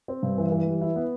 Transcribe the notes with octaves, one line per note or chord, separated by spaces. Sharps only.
C4
G2
E3
E3
G3
E4
B3